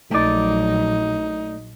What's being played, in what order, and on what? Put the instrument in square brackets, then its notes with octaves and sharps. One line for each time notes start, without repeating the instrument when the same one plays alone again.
[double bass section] A#1 F#3 [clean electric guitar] A3 D5 [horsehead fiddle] D#4